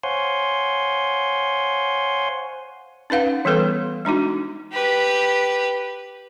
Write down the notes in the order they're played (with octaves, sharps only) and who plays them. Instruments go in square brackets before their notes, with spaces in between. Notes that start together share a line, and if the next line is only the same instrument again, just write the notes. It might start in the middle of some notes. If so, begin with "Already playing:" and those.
[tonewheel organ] C5 C#5 F5 F#5 G#5 C6
[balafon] C#4 D#4 B4 F5 F#5
E3 G3 B3 A4 B4
G#3 D4 D#4 F#4
[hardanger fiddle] G4 B4